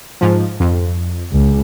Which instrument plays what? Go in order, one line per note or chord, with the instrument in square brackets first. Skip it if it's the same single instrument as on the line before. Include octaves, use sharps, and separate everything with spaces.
[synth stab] G#2 F3
F2
[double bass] C#2